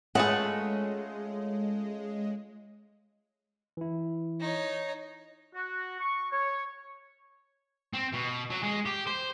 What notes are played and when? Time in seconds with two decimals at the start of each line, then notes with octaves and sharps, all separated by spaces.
0.15 G#3 A3 C#4 F4 G#4 B4 D#5 F#5
3.77 E3 E4
4.40 D#4 C#5
5.54 F#4
6.00 C#6
6.32 C#5
7.94 C4
8.13 B2
8.51 F#3
8.63 G#3
8.86 G4
9.07 C5